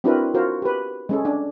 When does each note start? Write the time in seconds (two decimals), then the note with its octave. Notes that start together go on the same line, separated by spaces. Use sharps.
0.04 C4 D4 E4 F#4 A#4 B4
0.34 F4 F#4 A#4 C5
0.62 G4 B4
1.09 G#3 C#4 A4
1.25 D4